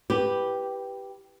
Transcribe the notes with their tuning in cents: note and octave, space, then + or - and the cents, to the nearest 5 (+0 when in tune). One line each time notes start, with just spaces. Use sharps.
G4 +0 B4 -5